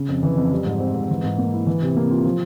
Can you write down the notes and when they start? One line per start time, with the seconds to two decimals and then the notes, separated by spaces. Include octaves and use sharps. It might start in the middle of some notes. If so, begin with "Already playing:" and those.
Already playing: C#3
0.09 F2
0.23 E3
0.37 F2
0.52 G3
0.65 G#2
0.80 C4
0.95 G#2
1.10 E3
1.24 G#2
1.38 A#3
1.53 E4
1.67 E3
1.82 C3
1.97 A#3
2.11 F4
2.25 F3